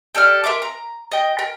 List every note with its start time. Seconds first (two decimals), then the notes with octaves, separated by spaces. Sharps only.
0.15 G4 A4 D5 F6
0.44 A#4 E5 C6 D6
0.62 A#5
1.12 D#5 G5
1.39 A#4